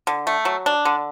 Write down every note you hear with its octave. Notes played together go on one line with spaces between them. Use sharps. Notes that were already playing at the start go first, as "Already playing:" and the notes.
D3
A3
F#3
D4
D3